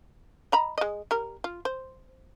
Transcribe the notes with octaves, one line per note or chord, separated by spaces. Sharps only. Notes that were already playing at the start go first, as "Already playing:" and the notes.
D#5 A#5 B5
G#3 D#5
G3 A#4
F4
C5